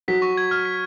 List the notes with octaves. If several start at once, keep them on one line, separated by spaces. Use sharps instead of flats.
F#3 F#4 B6
C#6
G#6
F6
B6